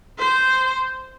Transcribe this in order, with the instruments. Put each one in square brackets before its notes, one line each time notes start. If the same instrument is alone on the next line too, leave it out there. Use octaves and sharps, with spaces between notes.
[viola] C5